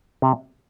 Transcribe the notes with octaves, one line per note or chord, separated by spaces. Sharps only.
C3